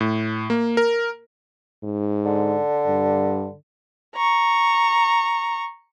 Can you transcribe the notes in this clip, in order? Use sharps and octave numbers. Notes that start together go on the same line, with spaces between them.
A2
A#3
A#4
G#2
D3
G2
A#5 C#6